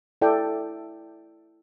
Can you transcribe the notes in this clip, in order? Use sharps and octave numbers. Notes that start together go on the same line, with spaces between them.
E4 A4 D5 G5